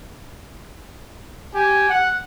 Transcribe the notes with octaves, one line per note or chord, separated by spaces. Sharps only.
G4 G#5
F#5